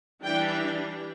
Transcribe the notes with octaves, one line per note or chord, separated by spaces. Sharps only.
E3 G3 D4 G5